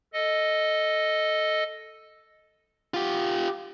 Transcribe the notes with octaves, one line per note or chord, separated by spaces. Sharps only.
A4 D#5
F4 G4